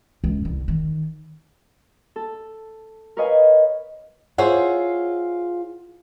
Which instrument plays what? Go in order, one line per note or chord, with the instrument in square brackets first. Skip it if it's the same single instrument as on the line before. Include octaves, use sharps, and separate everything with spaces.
[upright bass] C#2
C2
D#3
[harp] A4
A#4 B4 C#5 D#5 F5 G#5
[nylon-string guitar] F4 G#4 C5 C#5 E5 F#5